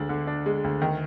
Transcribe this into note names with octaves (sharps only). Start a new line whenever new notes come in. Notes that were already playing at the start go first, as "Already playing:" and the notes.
Already playing: D2 G#3 D4
D3
D4
G#3
D2
D#3